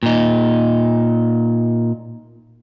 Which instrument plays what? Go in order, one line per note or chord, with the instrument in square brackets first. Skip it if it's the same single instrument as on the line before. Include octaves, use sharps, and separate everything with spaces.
[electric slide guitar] A#2 D#4